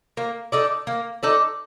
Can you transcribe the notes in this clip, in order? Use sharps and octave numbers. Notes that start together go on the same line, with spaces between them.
A#3
D#4 A4 D5
A#3
D#4 A4 D5